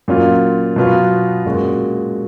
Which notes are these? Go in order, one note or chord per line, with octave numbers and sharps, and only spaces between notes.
A#2 F#3 C#4 F4
B2 F#3 B3 F4
A#2 G#3 C#4 F#4